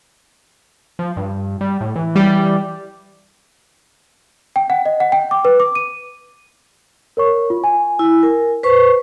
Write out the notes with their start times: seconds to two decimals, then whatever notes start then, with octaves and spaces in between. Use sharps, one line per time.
0.99 F3
1.17 G2
1.61 G3
1.81 A2
1.96 E3
2.16 G3
4.56 G5
4.70 F#5
4.86 D#5
5.00 F#5
5.12 G5
5.31 D6
5.45 B4
5.60 D6
5.75 D#7
7.17 A#4 C#5 C#6
7.50 F4
7.64 G#5
7.99 E4
8.23 A#4
8.63 B4 C5 C#6